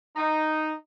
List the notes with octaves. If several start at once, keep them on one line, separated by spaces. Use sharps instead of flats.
D#4